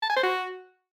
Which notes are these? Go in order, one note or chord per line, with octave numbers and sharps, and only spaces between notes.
A5
G#5
C5
F#4